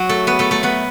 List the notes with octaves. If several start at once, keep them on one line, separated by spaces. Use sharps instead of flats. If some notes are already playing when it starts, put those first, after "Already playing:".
Already playing: F#3 F#4
A3 A4
B3 B4
A3 A4
A3 A4
B3 B4